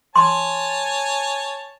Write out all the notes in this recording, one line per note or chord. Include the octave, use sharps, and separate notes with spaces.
C#5 G#5 A5 C6